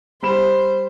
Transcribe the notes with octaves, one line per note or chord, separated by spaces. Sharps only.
G3 C5 B5 E7